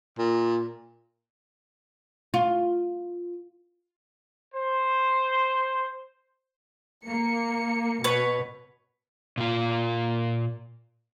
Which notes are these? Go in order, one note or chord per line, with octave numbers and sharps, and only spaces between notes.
A#2
F4
C5
A#3 C#7
B2 B4 C#5
A#2 F4